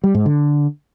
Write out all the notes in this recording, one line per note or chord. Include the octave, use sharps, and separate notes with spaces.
G3
G#2
D3